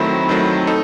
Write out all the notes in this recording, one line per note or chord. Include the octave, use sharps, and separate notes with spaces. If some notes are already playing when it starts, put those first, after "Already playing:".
Already playing: D#3 F#3 A3 C4 E4
D#3 F#3 A3 C4
D#4 A4